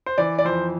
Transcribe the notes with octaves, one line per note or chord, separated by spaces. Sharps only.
C5
E3 D5
D5
F2 C5